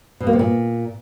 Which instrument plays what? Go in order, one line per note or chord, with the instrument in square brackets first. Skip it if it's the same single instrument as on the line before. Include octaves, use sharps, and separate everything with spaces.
[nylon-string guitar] B2
A#3
C3
A#2